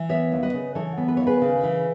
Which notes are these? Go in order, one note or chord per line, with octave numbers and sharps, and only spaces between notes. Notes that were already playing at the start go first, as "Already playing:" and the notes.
Already playing: E3
B3 C#5 E5
D#2
B4 D#5
C#3
E3 A4 C#5
B3
B4
D#2 C#5
G#4 B4
C#3
E3